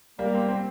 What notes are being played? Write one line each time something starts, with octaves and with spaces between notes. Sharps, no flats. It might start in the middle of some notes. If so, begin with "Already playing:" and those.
G3 A#3
C4
C4